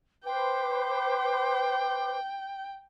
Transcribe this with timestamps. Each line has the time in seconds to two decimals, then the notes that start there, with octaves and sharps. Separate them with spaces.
0.24 B4 C5 G5 D6